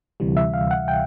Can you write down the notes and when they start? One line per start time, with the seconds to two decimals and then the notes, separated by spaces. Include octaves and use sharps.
0.20 D2 C3 E3 G3
0.37 E5
0.54 F5
0.71 F#5
0.88 G5